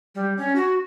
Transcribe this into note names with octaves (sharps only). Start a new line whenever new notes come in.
G3
C#4
F#4